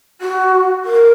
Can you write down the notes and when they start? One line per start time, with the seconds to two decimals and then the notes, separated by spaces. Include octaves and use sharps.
0.21 F#4
0.84 A#4